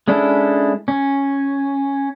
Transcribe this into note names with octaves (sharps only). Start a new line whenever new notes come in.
G#3 C#4 D4 E4 A4
C#4